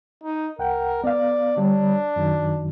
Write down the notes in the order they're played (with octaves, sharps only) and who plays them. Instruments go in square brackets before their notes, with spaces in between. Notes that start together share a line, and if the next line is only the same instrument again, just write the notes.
[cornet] D#4
[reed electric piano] C2 F#5 G5 [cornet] A#4
[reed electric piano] B3 F5 [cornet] D5
[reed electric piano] D3 G3 C#5 [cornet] D4
[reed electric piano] F#2 D#3 F#3